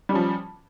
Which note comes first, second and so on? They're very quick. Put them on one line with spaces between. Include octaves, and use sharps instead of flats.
G3 C#4 F3